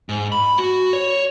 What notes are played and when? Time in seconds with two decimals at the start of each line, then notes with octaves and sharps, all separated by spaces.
0.09 G#2
0.32 B5
0.58 F#4
0.93 C#5